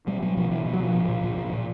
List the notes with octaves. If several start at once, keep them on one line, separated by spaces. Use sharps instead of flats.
B2 G3
B2 F#3
B2 F3
B2 E3
B2
F#3
B2 F3
A#2
A#2
A#2
A#2
A#2